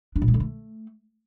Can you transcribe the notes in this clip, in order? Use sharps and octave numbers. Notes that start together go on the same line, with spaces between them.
D4
A#2
G#3
D3
A3